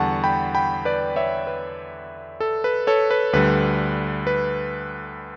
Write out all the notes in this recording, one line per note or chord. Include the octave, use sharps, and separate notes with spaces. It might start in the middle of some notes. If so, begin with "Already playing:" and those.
Already playing: E2 D3 G3 F#5 A5 C#6
G5 B5
G5 B5
B4 D5
C#5 E5
B4
A4
B4
A4 C#5
B4
D2 D3 G3 B4
B4